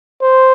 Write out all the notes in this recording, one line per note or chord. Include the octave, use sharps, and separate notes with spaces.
C5